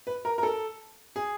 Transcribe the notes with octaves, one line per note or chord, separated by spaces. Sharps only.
B4
A#4
A#4
A4
G#4